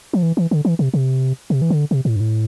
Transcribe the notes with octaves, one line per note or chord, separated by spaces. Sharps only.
F3
E3
E3
D3
E3
C3
C3
C3
E3
D3
C3
A2
G2
A2